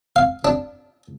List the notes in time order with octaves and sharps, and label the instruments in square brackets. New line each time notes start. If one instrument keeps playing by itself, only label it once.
[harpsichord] F5
D4